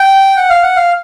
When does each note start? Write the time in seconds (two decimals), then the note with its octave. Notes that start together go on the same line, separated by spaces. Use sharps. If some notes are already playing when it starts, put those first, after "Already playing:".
Already playing: G5
0.37 F#5
0.50 F5
0.63 F#5
0.76 F5